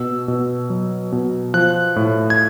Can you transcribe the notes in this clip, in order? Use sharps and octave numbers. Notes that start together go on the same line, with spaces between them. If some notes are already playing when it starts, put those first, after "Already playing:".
Already playing: B2 E6
B2
F#3
B2
F3 F#6
A2
G#6